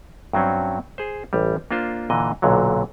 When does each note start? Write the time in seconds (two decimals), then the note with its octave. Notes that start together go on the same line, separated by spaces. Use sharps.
0.33 G2 F#3 C4 C#4
0.98 G#4 C5
1.33 A1 G3
1.71 A#3 D4 F4 C5
2.10 A#2 D3 E3 D#5
2.42 B1 A#2 D3 F#3